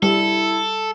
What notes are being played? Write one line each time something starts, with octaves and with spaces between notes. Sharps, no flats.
G3 E4 A4